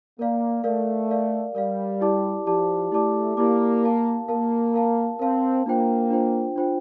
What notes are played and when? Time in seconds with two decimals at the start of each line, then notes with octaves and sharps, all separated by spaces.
0.19 A#3 A#4 D5 F5
0.64 A3 A#4 D5 F5
1.10 A#4 D5 F5
1.55 G3 A#4 D5 F5
2.01 E4 G4 D5 A5 D6
2.46 F3 E4 G4 D5 A5 D6
2.92 A3 E4 G4 D5 A5 D6
3.37 A#3 E4 G4 D5 A5 D6
3.83 A#4 F5 A5
4.28 A#3 A#4 F5 A5
4.74 A#4 F5 A5
5.19 C4 A#4 F5 A5
5.65 A#3 D4 F4 C5 G5
6.10 D4 F4 C5 G5
6.56 D4 F4 C5 G5